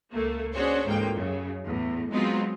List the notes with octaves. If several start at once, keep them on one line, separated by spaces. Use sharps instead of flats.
C#2 A3 A#3
C#4 D4 F#4 G#4 C5 C#5
A1 G#2 A#3 F4 G5
F#2 C#3
E2 A2
F#3 G#3 B3 C4 D#4 F4